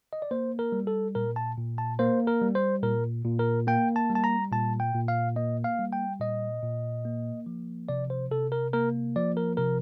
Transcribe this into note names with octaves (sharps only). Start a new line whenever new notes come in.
D#5
D5
A#3 C5
A#4
G3
A4
A#2 A#4
A5
A#2
A5
A#3 C5
A#4
G3
C5
A#2 A#4
A#2
A#4
A#3 G5
A5
G3
A5
A#5
A#2 A5
G5
A#2
F5
A#3 D#5
F5
G3
G5
A#2 D#5
A#2
A#3
F3
C3 D5
C5
C3 A4
A#4
A#3 A#4
F3 D5
A#4
C3 A#4